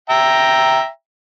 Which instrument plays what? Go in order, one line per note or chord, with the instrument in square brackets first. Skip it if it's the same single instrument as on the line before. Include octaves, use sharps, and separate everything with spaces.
[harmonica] E5 G5 A#5